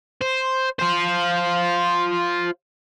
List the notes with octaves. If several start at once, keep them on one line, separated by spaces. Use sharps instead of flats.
C5
F4 C5